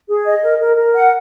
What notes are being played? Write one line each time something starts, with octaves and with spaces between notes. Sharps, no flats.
G#4
D#5
A#4
A#4
A#4
F#5